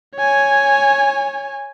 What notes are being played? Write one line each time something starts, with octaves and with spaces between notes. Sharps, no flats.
C#5 G#5